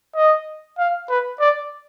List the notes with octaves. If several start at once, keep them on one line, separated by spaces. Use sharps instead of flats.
D#5
F5
B4
D5